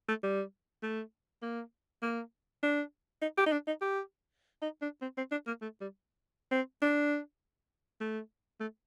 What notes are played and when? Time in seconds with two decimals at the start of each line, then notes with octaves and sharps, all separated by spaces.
0.08 A3
0.23 G3
0.82 A3
1.42 A#3
2.02 A#3
2.63 D4
3.21 D#4
3.37 G4
3.46 D#4
3.52 D4
3.67 D#4
3.81 G4
4.62 D#4
4.82 D4
5.01 C4
5.17 C4
5.31 D4
5.47 A#3
5.61 A3
5.81 G3
6.51 C4
6.82 D4
8.01 A3
8.60 A3